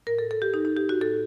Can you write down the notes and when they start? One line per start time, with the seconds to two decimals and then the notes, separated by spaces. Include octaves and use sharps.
0.07 A2 A#4
0.19 A4
0.31 A4
0.42 G4
0.54 D#4
0.65 D#4
0.77 G4
0.89 F#4
1.01 A2 A4